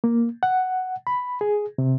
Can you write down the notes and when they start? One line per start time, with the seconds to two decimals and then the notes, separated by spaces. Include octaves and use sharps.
0.04 A#3
0.43 F#5
1.07 B5
1.41 G#4
1.78 C3